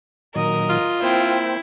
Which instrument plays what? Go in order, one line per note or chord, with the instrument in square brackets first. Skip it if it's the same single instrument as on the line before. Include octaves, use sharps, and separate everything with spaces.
[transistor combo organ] A#2 D#3 F#3 [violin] A#4 [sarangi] D#5
[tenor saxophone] F4
[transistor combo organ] A#3 C5 G5 [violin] C4 [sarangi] E4